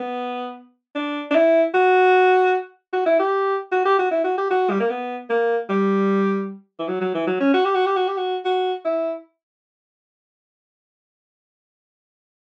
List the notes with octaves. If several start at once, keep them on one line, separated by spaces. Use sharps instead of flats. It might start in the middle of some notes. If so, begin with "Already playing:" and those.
Already playing: B3
D4
D4
E4
F#4
F#4
E4
G4
F#4
G4
F#4
E4
F#4
G4
F#4
G3
A#3
B3
A#3
G3
E3
F#3
F#3
E3
F#3
C#4
F#4
G4
F#4
G4
F#4
G4
F#4
F#4
E4